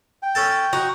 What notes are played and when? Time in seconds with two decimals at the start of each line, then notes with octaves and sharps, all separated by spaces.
0.23 G5
0.35 C#4 A4 A5
0.73 D#4 F#4